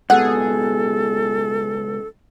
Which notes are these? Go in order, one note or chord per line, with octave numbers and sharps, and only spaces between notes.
C#2 B2 G#4 A4 F#5